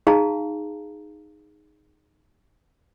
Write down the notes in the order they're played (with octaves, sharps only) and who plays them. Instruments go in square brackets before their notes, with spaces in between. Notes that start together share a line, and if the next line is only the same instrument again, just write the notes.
[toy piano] D#4 G#4 F5 A5 A#5